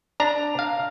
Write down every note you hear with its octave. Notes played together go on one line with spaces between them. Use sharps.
D4 A#5
F5